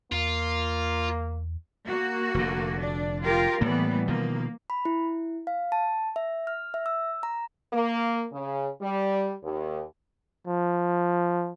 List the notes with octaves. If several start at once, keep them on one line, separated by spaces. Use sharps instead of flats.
E2 A#3 F4
A#3 F#4
F1 D3
D4
F4 G4 A#4
A2 E3 G3 A#3 B3
B2 D#3 F3 A#3
B5
E4
F5
A5
E5
F6
E5
E6
A#5
A#3
C#3
G3
D#2
F3